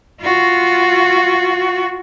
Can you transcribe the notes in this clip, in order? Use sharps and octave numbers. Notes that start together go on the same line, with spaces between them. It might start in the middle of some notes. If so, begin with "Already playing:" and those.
F4 F#4